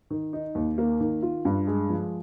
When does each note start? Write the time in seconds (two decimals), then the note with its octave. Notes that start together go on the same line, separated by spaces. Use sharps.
0.10 D#3
0.33 D#4
0.55 D#2
0.78 A#3
1.00 D#3
1.22 F4
1.45 G2
1.67 G#3
1.90 F3